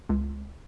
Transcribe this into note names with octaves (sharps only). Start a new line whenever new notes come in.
C#2